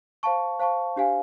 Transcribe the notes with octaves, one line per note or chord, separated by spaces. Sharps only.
C5 F5 A5 C#6
C5 F5 A5 C#6
D4 G4 C5 F5 G#5